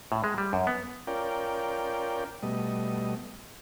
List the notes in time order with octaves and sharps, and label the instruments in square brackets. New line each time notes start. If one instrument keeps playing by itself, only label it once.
[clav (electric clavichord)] A2
G#3
G3
F#2
B3
[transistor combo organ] C#4 F4 A#4 D5 G5
B2 G3 A3 D#5